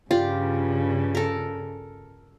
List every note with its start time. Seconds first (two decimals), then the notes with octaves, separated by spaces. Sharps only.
0.11 G2 C#3 F4 G4 D5
1.15 A4 A#4